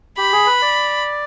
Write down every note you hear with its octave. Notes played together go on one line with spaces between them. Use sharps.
G4 B5
G#4
B4
D5